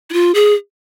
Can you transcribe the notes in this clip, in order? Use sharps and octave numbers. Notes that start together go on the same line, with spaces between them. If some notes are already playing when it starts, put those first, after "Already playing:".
E4
F4
G#4